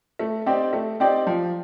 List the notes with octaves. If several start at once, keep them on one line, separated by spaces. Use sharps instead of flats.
A3
C4 D#4 G4 D5
A3
C4 D#4 G4 D5
F3